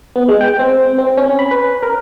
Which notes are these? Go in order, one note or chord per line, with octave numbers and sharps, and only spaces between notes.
B3
G#3
G5
C4
C4
C#4
B5
B4
A#4